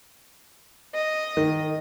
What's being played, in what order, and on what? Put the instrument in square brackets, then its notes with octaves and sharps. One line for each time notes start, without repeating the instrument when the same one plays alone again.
[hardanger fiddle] D#5
[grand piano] D#3